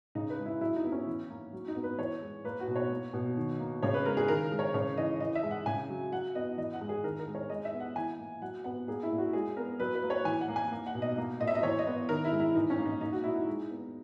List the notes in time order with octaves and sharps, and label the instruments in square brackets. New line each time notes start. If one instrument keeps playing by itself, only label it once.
[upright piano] C#3 D#4
B4
G#3
E4
F#3 E4
D#4
B3
C#4
E3
A#3
F#3
D#4
B3
B4
E3 C#5
G#3
A#3 B4
F#4
B2
C#5
A#3
B2
D#3
A#3
C#3 C#5
B4
G#3 A#4
G#4
D#3 A#4
G#3
C#5
C#3 C#5
E3 D#5
E3 D#5
E5
G#3
F#5
C#3 G#5
F#3
F#3 F#5
B3 D#5
E3 D#5
F#5
G#3
G#4
D#3 A#4
A#4
G#3
C#5
G#3 D#5
E5
B3
F#5
E3 G#5
A#3
F#3 F#5
B3 F#5
A#3 G#4
E4
A#2
F#4
G#3 G#4
B3 A#4
F#3 B4
B4
A#3
C#5
E3 G#5
F#5
A#3
G#5
A#3
F#5
B2
D#5
A#3
A#2 D#5
E5
D#5
E3 C#5
D#5
B3
D#3 A#4
E4
G#3
E4
E3 D#4
C#4
A#3
D#4
A#3 D#4
F#4
A#2 E4
D#4
G#3
B3